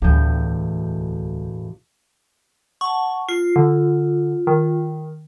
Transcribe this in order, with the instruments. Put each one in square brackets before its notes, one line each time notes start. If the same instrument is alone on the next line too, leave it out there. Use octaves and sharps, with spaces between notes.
[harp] E1 A2 G6 [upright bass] D2 G3
[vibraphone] F#5 A5 [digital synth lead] C#6
[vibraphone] F4 [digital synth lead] C7
[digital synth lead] D3
D#3